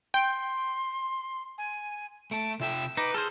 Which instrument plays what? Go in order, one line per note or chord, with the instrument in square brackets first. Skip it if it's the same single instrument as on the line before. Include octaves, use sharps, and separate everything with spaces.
[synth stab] G5 [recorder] C6
[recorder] G#5
[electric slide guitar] A3 A5 [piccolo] D7
[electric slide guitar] C3 F4 G5 [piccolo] E5
[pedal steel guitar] D#4 [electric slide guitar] B4 [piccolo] D6
[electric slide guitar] G#4 [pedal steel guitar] A4 C5 [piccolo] F6